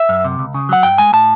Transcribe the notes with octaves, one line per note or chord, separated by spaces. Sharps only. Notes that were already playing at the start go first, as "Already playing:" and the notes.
Already playing: E5
F#2
C3
C#2
C#3
F#3 F#5
G2 G5
G#3 G#5
A2 A5